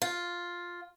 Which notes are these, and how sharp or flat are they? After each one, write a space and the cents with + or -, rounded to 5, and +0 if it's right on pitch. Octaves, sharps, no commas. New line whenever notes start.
F4 +5